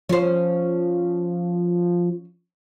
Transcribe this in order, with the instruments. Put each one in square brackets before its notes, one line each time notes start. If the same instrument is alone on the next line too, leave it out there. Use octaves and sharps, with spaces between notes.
[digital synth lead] F3 [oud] C#4 C5